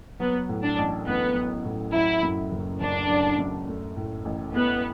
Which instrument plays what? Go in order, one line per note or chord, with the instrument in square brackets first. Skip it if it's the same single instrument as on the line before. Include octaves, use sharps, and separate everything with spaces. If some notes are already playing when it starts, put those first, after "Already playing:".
[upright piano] F#3 [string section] B3
[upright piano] A2
[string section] D4
[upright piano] A1
[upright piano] A1 [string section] B3
[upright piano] F#3
A2
[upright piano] F#3 [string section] E4
[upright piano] F#2
F#1
[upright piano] F#1 [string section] D4
[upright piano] F#3
F#2
A3
A2
A1
[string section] B3 [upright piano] E4